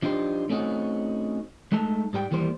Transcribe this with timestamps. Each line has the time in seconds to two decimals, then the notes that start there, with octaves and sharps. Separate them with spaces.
0.02 F3 D4 D#4 G4 C5
0.49 A3 C4 C#4 D#4 F#4
1.72 G#3 A3 D#4 A5
2.13 G#2 G3 A4 G5
2.31 D#2 E3 G3 A#3 C5